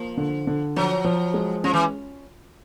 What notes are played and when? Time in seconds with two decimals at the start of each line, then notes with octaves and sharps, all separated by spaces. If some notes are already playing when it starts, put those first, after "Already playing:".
Already playing: F3 A#3
0.17 D3
0.47 D3
0.76 F3 F#3
1.04 F3
1.34 G#3
1.64 F3 C#4
1.73 E3